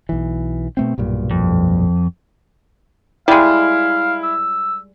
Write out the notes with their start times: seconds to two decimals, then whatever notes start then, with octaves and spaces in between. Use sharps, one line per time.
0.09 B1 E3
0.77 B2 A3 C4
0.98 B1 G2 A#2
1.31 F2
3.28 G3 G#3 E4 F5
4.23 E6